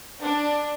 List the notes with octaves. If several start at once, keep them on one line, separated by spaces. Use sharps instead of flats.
D4